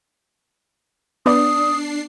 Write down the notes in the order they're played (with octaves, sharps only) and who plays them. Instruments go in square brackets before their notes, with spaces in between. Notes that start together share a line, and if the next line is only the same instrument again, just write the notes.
[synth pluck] B3 D5 [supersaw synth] D4 C7 [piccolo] D#6